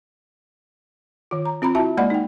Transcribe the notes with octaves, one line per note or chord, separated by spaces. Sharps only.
D#3 F4
A#5
C4 F4 A#5 B5
E4 F#4 E5 A5
G#3 A#3 D5 D#5 F#5 B5
D#4 G5